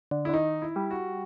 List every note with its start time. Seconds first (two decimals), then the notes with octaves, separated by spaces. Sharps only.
0.11 D3
0.25 E4
0.29 D3
0.34 D#3 D#4
0.62 E4
0.76 G3
0.91 F#4